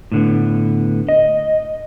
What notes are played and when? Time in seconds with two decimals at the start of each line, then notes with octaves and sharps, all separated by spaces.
0.12 A2 D3 B3
1.09 D#5